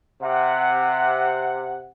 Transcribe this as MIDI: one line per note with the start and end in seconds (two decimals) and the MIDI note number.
0.22 1.87 48
0.22 1.87 78